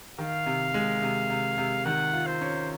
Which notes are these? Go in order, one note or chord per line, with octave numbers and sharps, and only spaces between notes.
D#3 F5
C3
G#3
C3
C3
C3
D#3 F#5
F4
C5
C#4